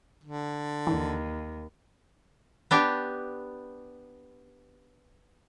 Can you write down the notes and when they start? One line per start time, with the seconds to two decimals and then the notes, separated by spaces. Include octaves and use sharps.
0.24 D3
0.87 D#2 E3
2.71 B3 D4 G4